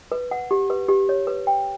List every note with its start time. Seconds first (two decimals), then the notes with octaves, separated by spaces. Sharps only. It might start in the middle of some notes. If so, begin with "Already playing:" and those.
0.12 B4
0.31 F#5
0.51 G4
0.70 B4
0.89 G4
1.09 C#5
1.27 B4
1.47 G5